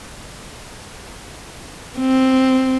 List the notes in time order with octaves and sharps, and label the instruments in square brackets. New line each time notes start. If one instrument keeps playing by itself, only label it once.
[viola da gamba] C4